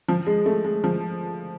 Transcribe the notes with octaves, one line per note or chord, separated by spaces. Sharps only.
F3
G#3
A3
G#3
F3